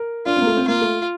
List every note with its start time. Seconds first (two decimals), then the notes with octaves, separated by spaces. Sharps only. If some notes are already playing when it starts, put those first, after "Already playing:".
Already playing: A#4
0.26 D4 F4
0.37 A#3 C4
0.47 A3
0.57 C4
0.67 A#3 F4
0.81 A3